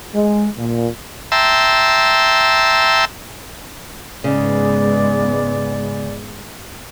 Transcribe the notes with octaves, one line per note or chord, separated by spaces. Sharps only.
G#3
A#2
E5 G5 A5 A#5 C6 E6
G#2 C#3 G#3 B3 D5